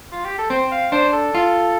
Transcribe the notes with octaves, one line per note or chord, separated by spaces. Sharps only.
F4
G4
A4
C4 C5
F5
D4 C5
A4
F4